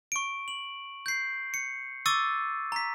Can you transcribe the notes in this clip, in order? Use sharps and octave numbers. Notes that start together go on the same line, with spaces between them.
C#6 D7
F#7
G6 C7
C#7
C#6 D6 E6 A6 D#7
A#5 B6